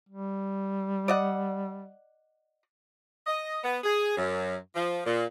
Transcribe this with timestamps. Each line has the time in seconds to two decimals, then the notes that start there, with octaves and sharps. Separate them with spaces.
0.09 G3
1.08 D5 D#5 F#5
3.27 D#5
3.64 B3
3.84 G#4
4.17 F#2
4.75 F3
5.06 A#2